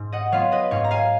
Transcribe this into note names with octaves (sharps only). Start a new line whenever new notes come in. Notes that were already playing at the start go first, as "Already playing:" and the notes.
Already playing: G#2
D#5 F#5
F#3 B3 F4 C#5 F5
B4 D#5
G#2 C#5 F5
A#5
F5 G#5